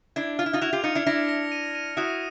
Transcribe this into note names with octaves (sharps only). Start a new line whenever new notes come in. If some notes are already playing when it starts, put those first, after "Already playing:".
D4 E4 G#6
F4 F6
E4
D#4 F4
E4 F#4 F7
F4 G4
D#4 F4 C#7
D4 E4
D4 E4 A#6
A#6
D#7
D#7
E4 F#4 D#6